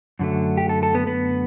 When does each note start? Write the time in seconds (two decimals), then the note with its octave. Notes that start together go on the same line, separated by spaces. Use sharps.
0.19 F#2 D3 F#3 A3
0.57 G4
0.69 A4
0.83 A4
0.95 B3
1.07 B3